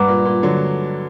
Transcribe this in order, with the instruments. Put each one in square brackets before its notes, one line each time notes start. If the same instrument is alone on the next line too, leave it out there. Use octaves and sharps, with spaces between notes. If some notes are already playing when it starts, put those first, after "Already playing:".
Already playing: [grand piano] G2 [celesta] B4 F#5 A#5 D6
[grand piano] A#2
A#2
D3 F#3